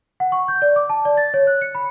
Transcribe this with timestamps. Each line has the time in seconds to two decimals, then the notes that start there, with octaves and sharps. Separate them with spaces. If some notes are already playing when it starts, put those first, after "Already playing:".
0.20 F#5
0.32 C#6
0.48 G6
0.62 D5
0.76 D6
0.90 A5
1.05 D5
1.17 A6
1.34 C#5
1.47 F#6
1.61 C#7
1.75 B5